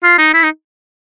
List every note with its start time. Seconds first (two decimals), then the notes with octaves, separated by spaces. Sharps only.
0.03 F4
0.18 D#4
0.34 E4
0.43 D#4